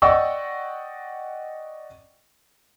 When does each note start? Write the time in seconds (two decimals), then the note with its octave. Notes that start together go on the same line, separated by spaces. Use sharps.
0.02 D5 D#5 F#5 G5 C#6 E6